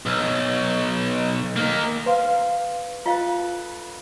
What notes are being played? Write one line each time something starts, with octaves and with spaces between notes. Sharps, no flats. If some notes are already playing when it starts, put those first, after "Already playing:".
B1
A#3 D#4
B4 F5 C6
F4 A4 B4 F5